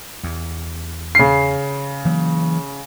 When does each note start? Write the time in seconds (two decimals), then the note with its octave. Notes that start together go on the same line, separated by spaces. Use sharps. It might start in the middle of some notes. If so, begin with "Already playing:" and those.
0.23 E2
1.15 C#3 C7
2.05 E3 F#3 A#3